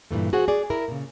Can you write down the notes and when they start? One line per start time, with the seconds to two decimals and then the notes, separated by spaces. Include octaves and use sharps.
0.11 G2 A#2 E3 A3
0.33 F#4 G#4 C5 F#5
0.48 G#4 D5
0.70 E4 A#4
0.88 A#2 C#3